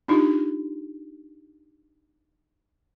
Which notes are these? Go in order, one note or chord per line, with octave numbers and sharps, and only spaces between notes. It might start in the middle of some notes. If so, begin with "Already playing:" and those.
D4 D#4 F4 G4